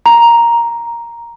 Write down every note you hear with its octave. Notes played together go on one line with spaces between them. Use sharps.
A#5